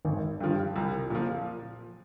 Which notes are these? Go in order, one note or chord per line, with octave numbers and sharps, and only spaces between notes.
G#1 D#3
G2 F3
C2
A#2 F3